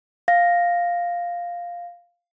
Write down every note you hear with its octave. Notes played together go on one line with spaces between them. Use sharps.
F5 A#6